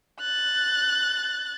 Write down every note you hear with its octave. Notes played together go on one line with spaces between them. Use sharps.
F#6 A6